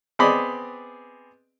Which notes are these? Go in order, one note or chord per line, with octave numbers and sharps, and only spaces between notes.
B3 C4 G#4 D5 D#5 B5